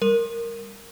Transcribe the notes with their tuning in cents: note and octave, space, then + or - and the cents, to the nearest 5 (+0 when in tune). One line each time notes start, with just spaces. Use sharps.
G3 +25 A#4 -5